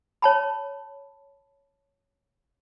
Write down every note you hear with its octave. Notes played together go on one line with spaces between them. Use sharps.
C#5 A5 B5